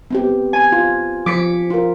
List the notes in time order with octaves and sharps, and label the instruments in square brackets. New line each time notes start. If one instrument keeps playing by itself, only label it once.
[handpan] B3 C4 G4
[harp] G#5
[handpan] F4
[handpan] F3 [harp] D6 B6 C#7
[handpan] F4 A#4